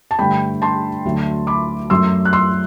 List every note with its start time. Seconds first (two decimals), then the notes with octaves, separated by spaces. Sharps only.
0.11 A5
0.19 G2 D3 A3 G5 B5
0.62 A5 C6
1.05 D2 D3 F#3 A3
1.47 B5 D6
1.90 F#2 F#3 A3 C6 E6
2.25 F#6
2.33 C6 E6